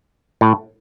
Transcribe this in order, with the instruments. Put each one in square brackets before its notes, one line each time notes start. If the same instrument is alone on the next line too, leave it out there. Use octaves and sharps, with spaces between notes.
[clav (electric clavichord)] A2